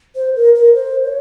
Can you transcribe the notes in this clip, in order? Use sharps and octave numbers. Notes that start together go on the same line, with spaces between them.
C5
A#4
A#4
C5
C#5